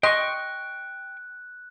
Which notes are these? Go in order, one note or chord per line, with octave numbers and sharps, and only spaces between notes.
D#5 G5 C6 C#6 F#6